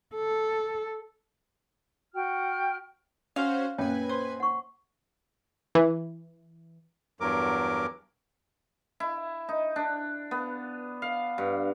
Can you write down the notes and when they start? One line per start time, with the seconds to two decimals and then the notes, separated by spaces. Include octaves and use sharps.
0.15 A4
2.13 F#4 G5 F6
3.36 C#4 F#4 C5 F5
3.78 F#2 A#2 B4 C#5 G5 G#5
4.09 C5
4.40 F#5 C#6
5.75 E3
7.20 E2 G2 F#3 A#4 D6
9.00 E4
9.49 D#4
9.76 D4
10.31 B3
11.02 F5
11.38 G2